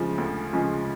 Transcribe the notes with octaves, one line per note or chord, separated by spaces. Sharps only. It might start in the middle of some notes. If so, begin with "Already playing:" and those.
Already playing: D2 C#3 F3 G#3
D2
C#3 F3 G#3